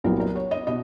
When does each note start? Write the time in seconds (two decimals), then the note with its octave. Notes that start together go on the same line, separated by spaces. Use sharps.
0.04 C2 A#2 F#3 B3 A#4
0.20 A#4
0.36 C#5
0.51 D#5
0.67 B2 D#5